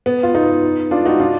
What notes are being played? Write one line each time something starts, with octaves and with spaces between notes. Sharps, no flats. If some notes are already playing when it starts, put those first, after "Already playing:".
B3
F4
B3 D#4
D4 F4
D#4 F#4
D4 F4